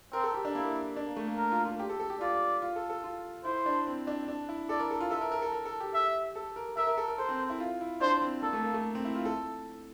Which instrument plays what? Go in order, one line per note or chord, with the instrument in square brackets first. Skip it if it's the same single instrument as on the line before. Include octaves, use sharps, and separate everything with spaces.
[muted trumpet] C4 [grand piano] A#4
[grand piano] A4
G4
D4
[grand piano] A#3 [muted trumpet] E4
[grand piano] D4
A#3
A3
A#3
[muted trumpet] A#4
[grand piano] F4
F4
G4
A4
A4
G4
[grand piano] F4 [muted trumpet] D5
[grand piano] F4
A4
A4
F4
[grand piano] E4 [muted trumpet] C5
[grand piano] D4
C4
D4
D4
E4
[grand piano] A4 [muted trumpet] D5
[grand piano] A#4
A4
F4
[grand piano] A4 [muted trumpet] E5
[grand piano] A#4
A#4
A4
A#4
A4
G4
[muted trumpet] E5
[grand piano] A4
A#4
[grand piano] A#4 [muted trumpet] E5
[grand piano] A#4
A4
A#4
[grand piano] A4 [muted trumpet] C5
[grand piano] C4
E4
F4
E4
[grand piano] D4 [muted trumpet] C5
[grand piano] C4
[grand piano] A#3 [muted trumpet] A4
[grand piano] A3
A#3
A3
C4
E4
F4
A4